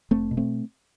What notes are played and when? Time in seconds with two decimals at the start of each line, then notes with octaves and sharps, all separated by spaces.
0.11 F1 A3 C4
0.31 B2
0.37 A3 C4